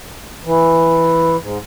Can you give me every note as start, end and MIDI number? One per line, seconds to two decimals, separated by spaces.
0.46 1.36 52
1.42 1.58 44